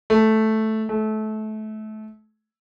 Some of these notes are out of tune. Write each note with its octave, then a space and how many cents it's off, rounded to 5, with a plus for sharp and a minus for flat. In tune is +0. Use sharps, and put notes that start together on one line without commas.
A3 -5
A3 -25